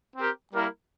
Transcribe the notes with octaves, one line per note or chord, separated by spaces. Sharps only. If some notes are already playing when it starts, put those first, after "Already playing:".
C4 G4 A#4
G3 A#3 E4 A#4